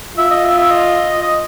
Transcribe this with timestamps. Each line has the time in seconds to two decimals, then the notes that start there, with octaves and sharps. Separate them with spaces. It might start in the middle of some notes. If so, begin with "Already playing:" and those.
0.17 F4 E5
0.30 D#5
0.44 E5
0.58 E5
0.70 D#5
1.22 D#5